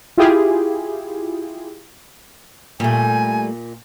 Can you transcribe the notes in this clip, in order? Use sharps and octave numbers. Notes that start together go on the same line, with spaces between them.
E4 F4 G4 G#4
A#2 G3 A3 G#5